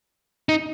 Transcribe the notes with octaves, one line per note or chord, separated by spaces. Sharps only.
D#4